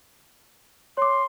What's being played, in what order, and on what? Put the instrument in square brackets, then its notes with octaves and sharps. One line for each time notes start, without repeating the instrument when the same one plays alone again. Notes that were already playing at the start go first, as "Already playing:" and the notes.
[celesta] C#5 D6 [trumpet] C6